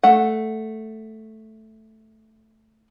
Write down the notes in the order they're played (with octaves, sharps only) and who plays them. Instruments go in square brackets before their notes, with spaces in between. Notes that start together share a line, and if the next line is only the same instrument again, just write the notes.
[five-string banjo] A3 F#5